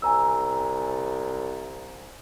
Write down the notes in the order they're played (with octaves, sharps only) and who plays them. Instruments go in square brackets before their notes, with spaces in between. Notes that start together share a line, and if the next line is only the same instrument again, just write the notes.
[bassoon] C2 [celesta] G#5 A#5 E6